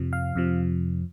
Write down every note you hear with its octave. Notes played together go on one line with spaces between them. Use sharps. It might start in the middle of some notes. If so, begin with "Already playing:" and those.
Already playing: F2 C3 F3
F5
F2 C3 F3